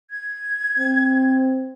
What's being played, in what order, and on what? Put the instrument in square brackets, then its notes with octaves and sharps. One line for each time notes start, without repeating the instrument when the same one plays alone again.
[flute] G#6
[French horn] C4